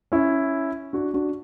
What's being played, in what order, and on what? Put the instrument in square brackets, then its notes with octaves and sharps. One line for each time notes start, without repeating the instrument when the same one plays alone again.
[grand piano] C#4 E4
D4 F#4
D4 F#4